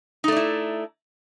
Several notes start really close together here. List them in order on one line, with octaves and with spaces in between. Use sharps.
D#4 A3 D5 E4